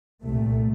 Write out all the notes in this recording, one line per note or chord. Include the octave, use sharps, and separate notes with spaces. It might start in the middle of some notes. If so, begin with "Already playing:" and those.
C2 A#2 A3